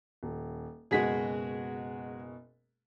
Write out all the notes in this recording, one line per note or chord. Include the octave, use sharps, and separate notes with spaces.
D#1
F#1 B2 G#3 F#4 G#4 B6